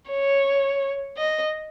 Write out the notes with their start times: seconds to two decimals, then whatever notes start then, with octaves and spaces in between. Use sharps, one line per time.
0.11 C#5
1.17 D#5